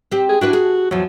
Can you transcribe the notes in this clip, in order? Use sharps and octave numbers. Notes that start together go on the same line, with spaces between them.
C4 G4
G#4
D4 E4 F#4 B4
G#4
E2 F3 F#3